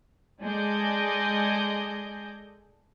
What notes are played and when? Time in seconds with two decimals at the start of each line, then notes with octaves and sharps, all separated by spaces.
0.42 G#3 G#4 A4 D5 D#5 G6